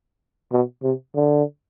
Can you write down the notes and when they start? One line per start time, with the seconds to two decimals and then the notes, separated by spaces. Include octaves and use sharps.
0.52 B2
0.83 C3
1.15 D3